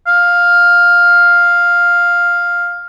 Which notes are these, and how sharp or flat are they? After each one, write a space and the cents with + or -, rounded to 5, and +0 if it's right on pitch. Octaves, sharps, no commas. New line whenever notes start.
F5 +5